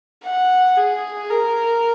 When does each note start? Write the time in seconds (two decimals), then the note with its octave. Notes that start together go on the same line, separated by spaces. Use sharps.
0.24 F#5
0.77 G#4
1.30 A#4